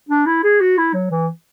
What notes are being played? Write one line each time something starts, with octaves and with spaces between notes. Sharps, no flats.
D4
E4
G#4
F#4
E4
F#3
E3